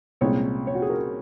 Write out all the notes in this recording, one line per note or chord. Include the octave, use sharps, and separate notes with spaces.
C2 A#2 G#3 C#4 C#5
C#5
F#4
G#4
A#4